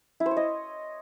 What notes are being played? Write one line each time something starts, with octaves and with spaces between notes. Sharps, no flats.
E4
C5
C#5
D#5